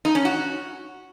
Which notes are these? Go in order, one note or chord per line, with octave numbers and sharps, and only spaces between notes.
D#4
C#4
F#4